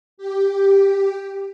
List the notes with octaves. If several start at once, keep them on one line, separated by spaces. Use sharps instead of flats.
G4